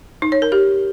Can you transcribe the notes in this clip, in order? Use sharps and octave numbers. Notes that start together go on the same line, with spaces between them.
D#4
C#5
A#4
G4